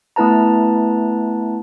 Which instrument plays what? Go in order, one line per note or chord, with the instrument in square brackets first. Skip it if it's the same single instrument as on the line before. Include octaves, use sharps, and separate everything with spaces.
[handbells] A3 B3 E4 B4 A5 A#5